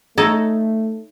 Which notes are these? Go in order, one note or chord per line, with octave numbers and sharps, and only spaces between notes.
A3 D#4 A4 C#5